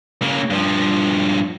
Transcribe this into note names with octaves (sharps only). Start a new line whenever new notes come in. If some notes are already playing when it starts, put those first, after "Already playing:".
C#3 A#3
G2 F3